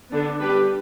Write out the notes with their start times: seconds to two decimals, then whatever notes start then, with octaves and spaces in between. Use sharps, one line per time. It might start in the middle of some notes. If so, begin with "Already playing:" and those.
0.12 D3 B3 D4
0.39 G3 D4 G4 B4